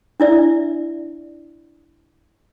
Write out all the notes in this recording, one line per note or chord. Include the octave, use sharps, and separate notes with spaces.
D4 E4 D5 E5